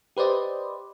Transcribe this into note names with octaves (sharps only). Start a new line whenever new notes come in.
G4 B4 C5 D5 D#5